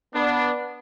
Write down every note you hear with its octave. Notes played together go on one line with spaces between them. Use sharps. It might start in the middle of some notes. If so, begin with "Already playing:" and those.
B3 D4